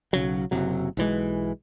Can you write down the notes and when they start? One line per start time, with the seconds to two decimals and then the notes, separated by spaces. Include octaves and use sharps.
0.13 B1 C#3 F#3
0.51 F#1 C3 F#3
0.97 B1 E3 G#3